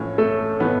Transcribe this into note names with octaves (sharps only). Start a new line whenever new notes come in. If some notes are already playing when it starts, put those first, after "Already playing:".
Already playing: A#1 A2 E3 C#4 C#5
A3 A4
A2 E3 B3 B4